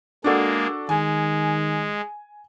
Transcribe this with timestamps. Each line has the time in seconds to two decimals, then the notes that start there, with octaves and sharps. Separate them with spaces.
0.24 G#3 A#3 D4 F#4 A4
0.89 D#3 G#3 G#5